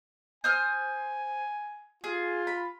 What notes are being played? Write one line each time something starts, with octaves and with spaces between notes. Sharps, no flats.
C5 G#5 D#6 F6
F4 G#4
B5